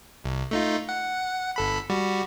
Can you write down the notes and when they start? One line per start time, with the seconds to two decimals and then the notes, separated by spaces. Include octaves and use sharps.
0.24 C2
0.51 A3 D#4 F4
0.89 F#5
1.56 G1 A4 B5
1.90 G3 F#4